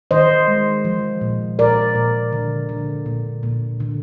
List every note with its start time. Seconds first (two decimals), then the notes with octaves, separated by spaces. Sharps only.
0.11 D#3 C5 D#5
0.48 G#3
0.85 F3
1.21 A#2
1.59 A#2 A#4 D5
1.95 A#2
2.32 D3
2.69 D3
3.06 A#2
3.43 A#2
3.80 D3